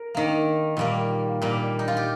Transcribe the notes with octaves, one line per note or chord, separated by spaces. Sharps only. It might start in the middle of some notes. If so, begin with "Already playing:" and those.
Already playing: A#4
D#3 A#3
A#2 G3 A#3
A#2 G3 A#3
D#4
F4
G4